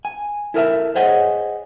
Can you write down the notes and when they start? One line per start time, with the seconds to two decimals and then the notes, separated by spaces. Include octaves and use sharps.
0.05 G#5
0.54 E4 A4 A#4 D#5 E5
0.95 G#4 C5 C#5 D#5 F#5 G#5